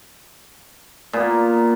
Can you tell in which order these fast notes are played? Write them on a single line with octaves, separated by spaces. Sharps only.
A#2 B3 A#3